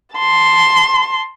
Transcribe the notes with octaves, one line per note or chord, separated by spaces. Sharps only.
A5 C6